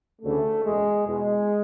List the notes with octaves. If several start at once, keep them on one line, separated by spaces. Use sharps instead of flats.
D2 C#3 E3 A3
F#1 E2 B2 G#3
E2 B2 G#3